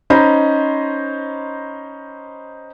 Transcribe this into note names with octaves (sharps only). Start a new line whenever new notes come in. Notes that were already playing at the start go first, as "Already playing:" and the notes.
C#4 D#4 C5 D#5 A#5 B5